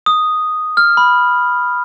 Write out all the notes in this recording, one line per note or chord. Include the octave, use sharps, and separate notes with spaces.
D#6
F6
B5